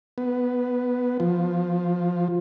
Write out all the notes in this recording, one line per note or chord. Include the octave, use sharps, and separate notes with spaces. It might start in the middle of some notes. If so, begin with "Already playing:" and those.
B3
F3